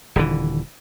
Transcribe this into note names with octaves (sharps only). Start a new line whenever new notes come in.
D#1 D3 E3